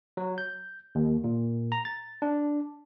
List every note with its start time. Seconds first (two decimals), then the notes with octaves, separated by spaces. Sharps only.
0.17 F#3
0.38 G6
0.95 D#2
1.24 A#2
1.72 A#5
1.85 A6
2.22 D4